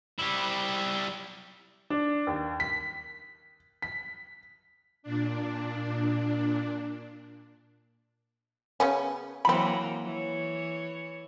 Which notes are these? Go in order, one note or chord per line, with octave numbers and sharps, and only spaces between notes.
G3 E4
D4
D#2
B6
B6
A#2 D4
C#3 B3 C#4
E3 F#3 A#3 C4 B5
E3 C#5